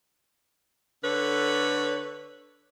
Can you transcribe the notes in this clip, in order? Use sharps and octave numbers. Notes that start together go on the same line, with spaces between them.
D3 A4 B4 C#5